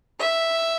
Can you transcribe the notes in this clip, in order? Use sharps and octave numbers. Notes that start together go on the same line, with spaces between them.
E5